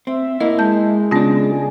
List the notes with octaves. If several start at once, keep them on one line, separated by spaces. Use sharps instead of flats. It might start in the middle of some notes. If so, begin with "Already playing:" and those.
C4 E5
A#3 E4 D#5
G#3 A5 G6
C#3 B3 C#4 D4 F4
G#4